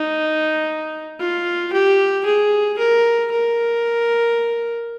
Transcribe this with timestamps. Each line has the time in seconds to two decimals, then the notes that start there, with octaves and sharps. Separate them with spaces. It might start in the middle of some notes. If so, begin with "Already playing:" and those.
Already playing: D#4
1.20 F4
1.73 G4
2.26 G#4
2.79 A#4
3.32 A#4